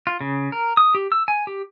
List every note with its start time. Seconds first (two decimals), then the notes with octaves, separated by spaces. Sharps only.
0.07 F4
0.21 C#3
0.52 A#4
0.77 D#6
0.95 G4
1.12 E6
1.28 G#5
1.47 G4